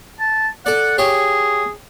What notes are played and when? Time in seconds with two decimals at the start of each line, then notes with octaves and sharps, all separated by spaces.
0.20 A5
0.66 A4 D5 F#5
0.98 G4 G#4 C#5 F5